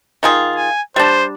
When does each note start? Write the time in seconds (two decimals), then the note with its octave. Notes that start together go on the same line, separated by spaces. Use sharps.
0.23 D#3 F4 G#4
0.56 G#5
0.96 G3 D4 C5